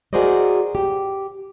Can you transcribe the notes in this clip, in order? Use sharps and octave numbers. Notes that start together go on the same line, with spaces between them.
F#4 G#4 A#4 C5 D5 D#5
G4